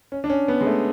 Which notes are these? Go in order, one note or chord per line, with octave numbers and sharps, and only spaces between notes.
C#4
D4
C#4
B3
G#3
A3